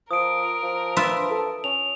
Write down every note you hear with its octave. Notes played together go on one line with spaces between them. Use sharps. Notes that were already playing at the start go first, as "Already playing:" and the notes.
F3 A#4 D#6 D7
F3
F4 B4 E5
A4
C#4 F7